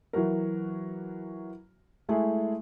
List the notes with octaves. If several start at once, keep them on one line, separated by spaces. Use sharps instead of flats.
E3 F#3 F#4 A#4
G#3 A3 E4 G#4